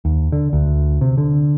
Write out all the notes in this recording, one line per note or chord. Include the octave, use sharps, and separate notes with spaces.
D#2
D3
D2
C3
D3